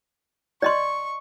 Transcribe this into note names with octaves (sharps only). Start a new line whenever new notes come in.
D5 D#5 C6 C#6